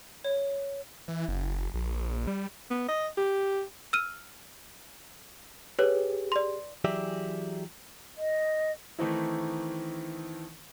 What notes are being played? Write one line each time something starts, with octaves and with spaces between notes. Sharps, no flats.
C#5
E3
F#1
A#1
G3
B3
D#5
G4
E6 F6 D#7
G4 G#4 B4 C#5
D5 C6
E3 F#3 G4 G#4 D5 E5
D#5
D#3 E3 A3 C4 D#4 E4